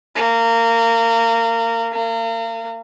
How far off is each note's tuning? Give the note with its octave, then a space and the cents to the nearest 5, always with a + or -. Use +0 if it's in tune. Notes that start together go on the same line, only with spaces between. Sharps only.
A#3 -25
A#3 -35